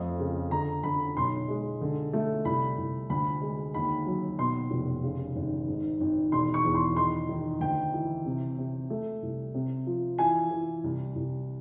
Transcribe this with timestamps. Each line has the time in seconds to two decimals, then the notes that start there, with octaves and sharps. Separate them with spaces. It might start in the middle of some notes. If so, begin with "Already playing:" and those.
Already playing: F2 A3
0.20 C#3
0.51 D3 A#5
0.83 D3 B5
1.17 B1 C6
1.48 G#3
1.81 D3
2.13 A3
2.45 C2 B5
2.78 C2
3.10 D2 B5
3.41 G#3
3.74 D#2 B5
4.06 F#3
4.39 B2 C6
4.71 F1
5.04 C#3
5.36 G#1
5.68 G#2
6.00 G#1
6.32 E1 C6
6.54 C#6
6.65 E2
6.75 C6
6.96 D#3 C6
7.29 D#3
7.61 D2 G5
7.94 E3
8.25 C3
8.58 C3
8.90 A3
9.22 C2
9.54 C3
9.87 F3
10.18 E3 G#5
10.51 E3
10.84 C2
11.15 C2